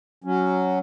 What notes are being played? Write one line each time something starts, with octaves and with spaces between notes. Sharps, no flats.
F#3 C#4